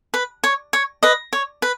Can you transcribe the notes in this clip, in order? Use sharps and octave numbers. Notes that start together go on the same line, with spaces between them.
B4
C#5
C#5
B4 D#5
C#5
B4